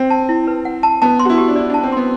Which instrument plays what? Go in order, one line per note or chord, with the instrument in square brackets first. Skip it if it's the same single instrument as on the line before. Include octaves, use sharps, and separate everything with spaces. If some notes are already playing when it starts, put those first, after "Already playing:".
Already playing: [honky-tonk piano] C4
[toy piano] A5
E4
B4
F#5
A5
[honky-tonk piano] B3 [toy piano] A5
[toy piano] C6
[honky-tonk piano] F#4
E4
[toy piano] G4
[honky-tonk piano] D4
[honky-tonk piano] E4 [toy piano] D5
[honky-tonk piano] D4 [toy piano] A5
[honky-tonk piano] C4
[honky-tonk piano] B3 [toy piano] C6